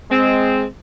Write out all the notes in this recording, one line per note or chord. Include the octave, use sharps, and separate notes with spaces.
G#3 C4